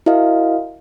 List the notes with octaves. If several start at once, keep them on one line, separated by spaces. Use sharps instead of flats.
E4 F#4 A#4 D#5 F5